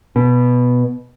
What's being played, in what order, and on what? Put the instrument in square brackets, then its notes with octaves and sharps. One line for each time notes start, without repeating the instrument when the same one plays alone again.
[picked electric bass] B2